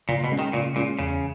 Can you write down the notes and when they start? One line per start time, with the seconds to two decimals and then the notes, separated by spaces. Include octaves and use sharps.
0.09 A#2 C#3
0.24 B2
0.32 G#3 C#4
0.39 D#3
0.53 A#2 C#3
0.76 A#2 G#3 C#4
0.98 E2 C#3